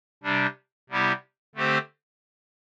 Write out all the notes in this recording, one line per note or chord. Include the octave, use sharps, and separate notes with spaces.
C3 G3 D4
C3 G3 B3 E4 G4
D3 A3 C4 G4 C5